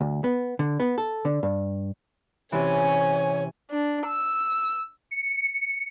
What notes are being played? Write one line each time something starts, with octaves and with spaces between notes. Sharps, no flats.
D2
B3
D3
B3
A4
D3
G2
C3 E3 C#4 C#5 G#5
D4
E6
C#7